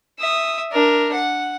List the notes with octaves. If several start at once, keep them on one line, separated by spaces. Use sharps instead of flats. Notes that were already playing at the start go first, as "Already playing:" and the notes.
E5 D#6
D4 A#4
F#5